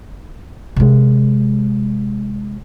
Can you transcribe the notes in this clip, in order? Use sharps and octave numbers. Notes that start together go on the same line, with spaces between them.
C3 G#3